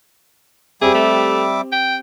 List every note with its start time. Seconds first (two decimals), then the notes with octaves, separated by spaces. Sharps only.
0.82 G3 C4 G4 G#4 E5 D6
0.95 A3
1.72 G5